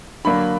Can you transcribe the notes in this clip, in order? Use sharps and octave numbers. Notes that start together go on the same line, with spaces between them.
D3 F#3 A#3 D4 B5